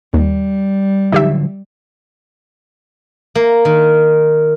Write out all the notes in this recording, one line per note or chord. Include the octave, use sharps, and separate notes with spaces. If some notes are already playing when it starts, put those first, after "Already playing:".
D#2 G3
D3 F3 F#3 D#4 G4 E5
A#3
D#3